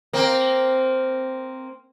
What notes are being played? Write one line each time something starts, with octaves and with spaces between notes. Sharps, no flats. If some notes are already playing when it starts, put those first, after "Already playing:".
A#3 C4